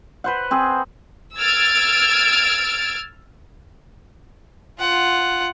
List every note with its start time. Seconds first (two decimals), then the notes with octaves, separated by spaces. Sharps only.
0.24 B4 C5 F#5
0.51 C4 G#4
1.37 E6 F6 G#6 A6 D7
4.79 F4 F#5